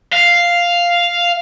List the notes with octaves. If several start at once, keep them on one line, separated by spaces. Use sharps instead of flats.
F5